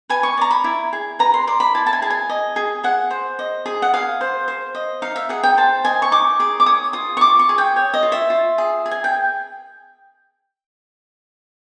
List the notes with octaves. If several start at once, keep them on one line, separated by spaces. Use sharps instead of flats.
B4 G#5
C#6
D5 A#5
B5
E4
G#4
B4 A#5
C6
D5 C6
B5
E4 A5
A5
G#5
G#4 A5
G#5
D#5
G#4
G#4 F#5
C5
D#5
G#4
F#5
G#4 F5
C5
C5
D#5
D#4 F5
E5
G#4 F#5
G5
C5 A5
D#5 G#5
C#6
D#4 D6
G#4 D6
D6
C#5 D#6
F4 D#6
C#6
F4 D6
C#6
G#4
G5
C#5
D#5
F4
E5
F4
G#4
G#4
G#5
G5